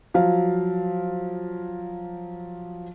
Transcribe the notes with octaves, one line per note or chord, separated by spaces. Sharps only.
F3 F#3 F5